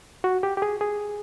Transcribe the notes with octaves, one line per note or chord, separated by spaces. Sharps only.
F#4
G4
G4
G#4
G#4